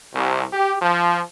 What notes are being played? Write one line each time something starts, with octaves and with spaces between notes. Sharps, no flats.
C2
G4
F3